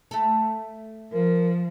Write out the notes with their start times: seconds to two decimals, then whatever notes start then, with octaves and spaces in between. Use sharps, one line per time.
0.11 A3 A4
1.13 F3 A#4